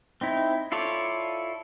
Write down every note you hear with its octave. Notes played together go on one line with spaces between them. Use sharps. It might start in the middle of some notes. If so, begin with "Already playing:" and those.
C4 D#4 E4
E4 F4 A4 C#5 D5